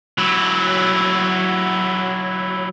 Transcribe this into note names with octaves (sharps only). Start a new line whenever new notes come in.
F#3 E4